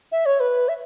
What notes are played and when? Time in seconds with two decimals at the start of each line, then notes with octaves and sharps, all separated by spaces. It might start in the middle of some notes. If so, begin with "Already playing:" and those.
0.12 E5
0.26 C#5
0.40 B4
0.69 E5